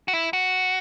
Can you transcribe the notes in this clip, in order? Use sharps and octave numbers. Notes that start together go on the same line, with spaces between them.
F#4
E4
F#4